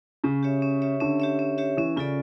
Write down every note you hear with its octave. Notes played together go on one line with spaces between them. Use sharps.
C#3 C#4
G4 C#5 E5
C#4
G4 C#5 E5
D3 C#4
G4 C#5 E5
C#4
G4 C#5 E5
E3 C#4
C#3 F4 A4 D5